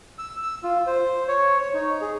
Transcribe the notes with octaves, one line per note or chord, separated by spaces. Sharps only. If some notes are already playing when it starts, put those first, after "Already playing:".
E6
E6
F4
C5
C#5
C#5
D#4
G#4